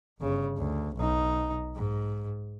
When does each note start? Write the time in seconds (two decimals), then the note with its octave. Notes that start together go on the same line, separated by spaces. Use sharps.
0.20 G1 C#3
0.57 D2
0.96 B1 D#4
1.75 G#2